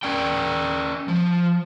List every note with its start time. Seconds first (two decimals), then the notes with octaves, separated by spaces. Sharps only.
0.03 C#4 D5 G5
1.08 F3